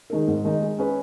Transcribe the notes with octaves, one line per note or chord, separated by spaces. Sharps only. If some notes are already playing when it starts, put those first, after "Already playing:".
D#3 G#3 D#4 A#4
G#2
D#3 G#3 D#4 A#4
G#3
C#4 G#4 B4